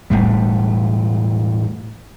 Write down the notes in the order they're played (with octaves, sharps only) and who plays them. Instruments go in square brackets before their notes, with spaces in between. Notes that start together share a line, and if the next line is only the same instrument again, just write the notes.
[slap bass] E1 D#2 A2 G3